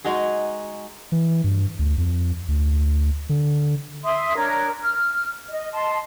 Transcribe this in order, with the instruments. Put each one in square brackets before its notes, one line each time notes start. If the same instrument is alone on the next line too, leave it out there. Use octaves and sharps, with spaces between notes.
[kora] G#3 D#4 F#4 G#4
[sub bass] E3
G2
D2
F2
D2
D3
[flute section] E5 C6 D#6
D4 A#4 C#5
F6
D#5
D#5 A5 C6